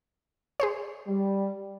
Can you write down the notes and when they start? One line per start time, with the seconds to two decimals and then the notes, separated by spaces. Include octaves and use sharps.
0.60 G#4 C5 C#5
1.08 G3